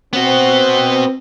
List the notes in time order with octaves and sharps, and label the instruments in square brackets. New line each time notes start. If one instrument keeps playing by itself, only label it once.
[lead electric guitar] B3 F#4 [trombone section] C4